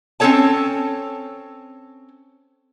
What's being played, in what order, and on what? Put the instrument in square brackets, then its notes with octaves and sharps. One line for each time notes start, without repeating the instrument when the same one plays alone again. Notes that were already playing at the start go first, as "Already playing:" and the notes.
[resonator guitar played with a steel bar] C4 C#4 D#4 A4 C#5 A5